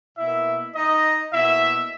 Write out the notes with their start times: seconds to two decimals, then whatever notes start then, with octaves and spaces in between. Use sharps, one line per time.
0.18 B2 A#3 E4 E5
0.75 D#4 D#5
1.33 B2 A#3 E4 E5